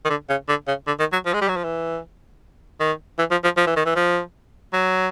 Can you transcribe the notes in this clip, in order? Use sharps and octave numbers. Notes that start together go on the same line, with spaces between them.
D#3
D3
C#3
D3
C#3
D3
D#3
F#3
F3
G#3
G3
F#3
F3
E3
D#3
E3
F3
F3
F3
E3
D#3
E3
F3
F#3